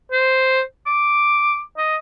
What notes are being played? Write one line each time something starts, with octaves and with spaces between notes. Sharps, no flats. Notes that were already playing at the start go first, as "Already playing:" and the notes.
C5
D6
D#5